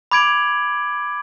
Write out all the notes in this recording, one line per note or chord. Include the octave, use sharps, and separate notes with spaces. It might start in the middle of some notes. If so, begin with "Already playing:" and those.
B5 D6 G#6 D7 F#7